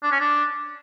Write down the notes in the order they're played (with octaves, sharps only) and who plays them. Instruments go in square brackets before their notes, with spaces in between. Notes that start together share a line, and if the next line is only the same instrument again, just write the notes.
[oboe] D4
C#4
D4